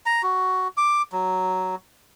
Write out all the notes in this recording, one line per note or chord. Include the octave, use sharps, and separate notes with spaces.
A#5
F#4
D6
F#3